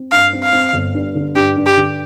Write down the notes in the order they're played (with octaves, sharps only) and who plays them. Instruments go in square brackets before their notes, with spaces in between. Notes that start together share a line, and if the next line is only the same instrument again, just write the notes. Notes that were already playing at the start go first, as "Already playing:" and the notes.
Already playing: [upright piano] C4
[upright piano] G2 [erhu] F5
[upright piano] C4
[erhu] F5
[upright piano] C4
G1
G2
D3
[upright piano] G2 [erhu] G4
[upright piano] G2
[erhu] G4
[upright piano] D3